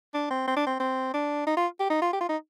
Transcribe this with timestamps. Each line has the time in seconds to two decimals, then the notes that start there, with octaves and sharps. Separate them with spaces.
0.14 D4
0.31 C4
0.47 C4
0.57 D4
0.66 C4
0.80 C4
1.14 D4
1.47 D#4
1.57 F4
1.80 G4
1.90 D#4
2.02 F4
2.13 G4
2.20 F4
2.29 D#4